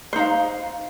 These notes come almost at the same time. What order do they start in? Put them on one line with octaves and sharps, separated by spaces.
C5 D#4 F5